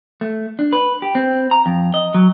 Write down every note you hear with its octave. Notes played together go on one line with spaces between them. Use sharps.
A3
D4
B4
G4
C4
A#5
F2
D#5
F#3